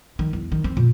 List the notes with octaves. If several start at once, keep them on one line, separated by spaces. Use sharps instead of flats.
D#3
E2
D#3
C4
A#2